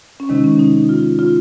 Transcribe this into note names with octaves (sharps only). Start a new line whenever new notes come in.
C#4
C3 D#3 G#3 D#4
C#4
D#4
F4
F4